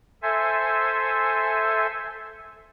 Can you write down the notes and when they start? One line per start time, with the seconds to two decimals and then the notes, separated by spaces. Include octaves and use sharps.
0.22 A4 C5 E5 G#5